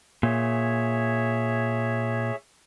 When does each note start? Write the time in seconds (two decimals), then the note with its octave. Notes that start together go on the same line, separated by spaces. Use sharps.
0.23 A#2 G#4 C#5 E5